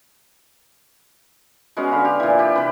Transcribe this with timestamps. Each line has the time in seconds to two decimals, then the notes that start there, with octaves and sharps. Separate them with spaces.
1.77 G#3 B3 C#4 F#4
1.92 D3 B4 F5
2.05 G4 F5
2.20 A#2 E3
2.39 G4 B4
2.56 C3 B4